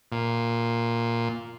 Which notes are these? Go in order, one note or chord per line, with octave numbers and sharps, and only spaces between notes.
A#2